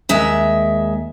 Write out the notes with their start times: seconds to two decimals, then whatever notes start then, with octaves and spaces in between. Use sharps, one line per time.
0.09 D#2 G#3 E5